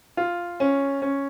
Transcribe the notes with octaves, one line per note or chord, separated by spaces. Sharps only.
F4
C#4
C#4